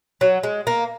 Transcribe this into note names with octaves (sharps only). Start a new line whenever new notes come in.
F#3
G#3
A#3